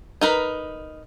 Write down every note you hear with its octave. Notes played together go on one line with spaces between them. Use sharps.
D#4 A#4 B4